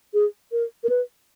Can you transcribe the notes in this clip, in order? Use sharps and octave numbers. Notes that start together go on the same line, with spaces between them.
G#4
A#4
A#4
B4